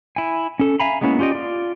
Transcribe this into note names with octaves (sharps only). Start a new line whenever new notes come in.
E4 G#5
C#4 A4
E5 F5 G#5 A#5 B5
G#3 A#3 B3 C#4 E4
C#4 F4 G4 D5 D#5
F4 D5